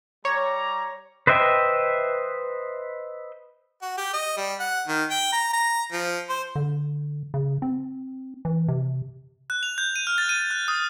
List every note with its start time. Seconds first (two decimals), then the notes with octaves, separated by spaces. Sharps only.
0.25 G3 C#5 A#5 D6
1.27 B4 C5 D#5 E5 G5
3.82 F#4
3.98 G4
4.14 D#5
4.37 G3
4.60 F#5
4.88 D#3
5.11 G5
5.32 A#5
5.53 A#5
5.93 F3
6.29 C5
6.56 D3
7.34 C#3
7.62 C4
8.45 E3
8.68 C3
9.50 F#6
9.63 F7
9.78 G6
9.96 D#7
10.07 F6
10.18 A6
10.29 D#7
10.51 F#6
10.68 D#6